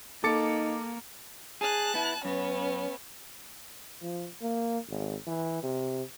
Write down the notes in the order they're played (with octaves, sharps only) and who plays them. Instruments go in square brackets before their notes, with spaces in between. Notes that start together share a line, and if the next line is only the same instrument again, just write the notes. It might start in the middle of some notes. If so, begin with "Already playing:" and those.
[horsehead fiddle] A#3 [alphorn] D#4 [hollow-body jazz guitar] A4 [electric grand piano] D6 A6 C#7
[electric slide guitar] G#4 [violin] A5 F#6
[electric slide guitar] B3 E4
[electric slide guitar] F#2 [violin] B3 C#4
[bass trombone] F3
A#3
G#1
E3
C3